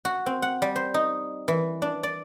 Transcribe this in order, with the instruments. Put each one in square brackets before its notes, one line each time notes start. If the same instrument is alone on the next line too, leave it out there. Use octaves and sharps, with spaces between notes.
[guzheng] F#4
C4
F#5
G3
C5
D#4
E3
D4
D5